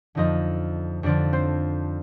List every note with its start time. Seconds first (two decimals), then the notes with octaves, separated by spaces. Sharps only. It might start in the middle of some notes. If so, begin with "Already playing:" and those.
0.15 F2 D3 F3 D#4 D#5
1.03 F2 D3 F3 D4 D5
1.33 C4 C5